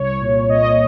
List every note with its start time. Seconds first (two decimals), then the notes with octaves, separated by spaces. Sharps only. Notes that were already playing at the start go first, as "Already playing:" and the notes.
Already playing: C2 C#5
0.21 A#2
0.49 A#2 D#5